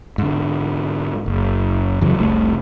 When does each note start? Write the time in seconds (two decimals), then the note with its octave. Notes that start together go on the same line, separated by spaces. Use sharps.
0.18 G#2 D3
1.26 F#1
2.01 E2 C#3 F#3
2.17 F1 C2 C3 A3